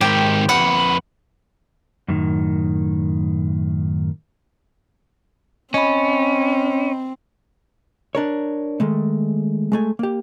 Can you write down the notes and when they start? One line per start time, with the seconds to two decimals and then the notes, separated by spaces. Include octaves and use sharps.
0.01 G#2 D#3 G4
0.49 F2 B4 F#5
2.08 F#2 A2 D#3
5.74 C4 C#4 D#5 B5
8.15 D4 A#4 C#5
8.80 D#3 G#3 A3
9.72 G#3 A3 G#5
9.99 A#3 G4